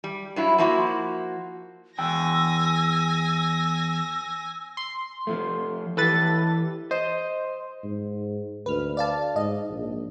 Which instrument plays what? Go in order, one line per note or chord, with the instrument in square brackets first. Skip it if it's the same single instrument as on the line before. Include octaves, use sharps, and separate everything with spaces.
[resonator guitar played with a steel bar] G3
G2 F#3 E4
F3 A#3 E4 F#4 C5
[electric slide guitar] E2 G5 [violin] G#5 A#6 [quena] E6
[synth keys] C6
[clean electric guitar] F3 A3
[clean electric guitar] E3 G4 [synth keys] A4 B4 A6
[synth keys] C5 [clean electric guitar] D#5
[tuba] G#2
[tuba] D2 [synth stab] B4 F6
[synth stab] D5 F5 A5
[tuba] G#2 [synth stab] D#5
[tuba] A#1